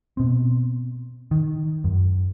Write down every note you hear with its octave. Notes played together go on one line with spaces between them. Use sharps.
B2 C4
D#3
F#2